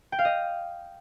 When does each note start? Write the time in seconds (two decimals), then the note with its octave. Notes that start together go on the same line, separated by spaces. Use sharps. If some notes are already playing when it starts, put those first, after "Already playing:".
0.12 G5
0.19 F5
0.25 D#5